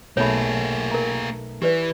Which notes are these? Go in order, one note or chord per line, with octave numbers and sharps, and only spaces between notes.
B1 B2 A3 A#3 G#4 C#5 B5
A#4 A#5
E3 G4 B4 D5